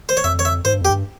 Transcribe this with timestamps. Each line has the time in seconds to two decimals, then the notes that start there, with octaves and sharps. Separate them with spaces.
0.09 C5
0.17 C#5
0.24 F2 E5
0.39 C#5
0.45 E5
0.65 G#2 C5
0.73 G2
0.81 F2
0.85 G4
0.90 G2